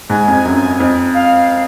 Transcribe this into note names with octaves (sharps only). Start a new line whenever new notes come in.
G#2 G#5
F2
F#2
F2
F5